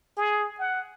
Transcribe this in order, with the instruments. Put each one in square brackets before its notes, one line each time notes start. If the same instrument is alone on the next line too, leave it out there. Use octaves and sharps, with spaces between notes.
[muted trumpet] G#4
F#5